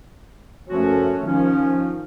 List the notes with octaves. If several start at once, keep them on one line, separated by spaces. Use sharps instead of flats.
F#2 F3 A3 C#4 F#4
D#3 F3 C#4